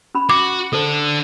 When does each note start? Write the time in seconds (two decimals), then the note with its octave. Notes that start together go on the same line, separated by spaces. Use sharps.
0.15 C#4 B5
0.29 F#4 D6
0.73 D3 D4 A4 C5